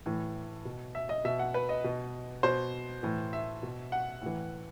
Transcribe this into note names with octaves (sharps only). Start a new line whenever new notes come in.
A2 E3
B2
E5
D#5
B2 E5
F#5
B4
D#5
B2
B2 C5
A2 E3
E5
B2
F#5
A2 E3